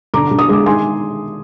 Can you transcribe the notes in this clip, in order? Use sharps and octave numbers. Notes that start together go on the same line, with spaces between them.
D3 A#5 D6
D3
D#6
G#3 D6
D#3 G#5 C6